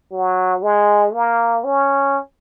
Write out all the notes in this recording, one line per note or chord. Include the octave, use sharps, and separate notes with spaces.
F#3
G#3
A#3
C#4